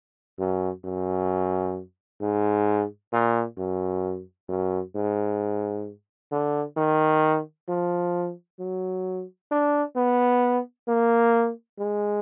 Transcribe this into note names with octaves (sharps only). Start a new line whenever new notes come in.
F#2
F#2
G#2
A#2
F#2
F#2
G#2
D3
D#3
F3
F#3
D4
B3
A#3
G#3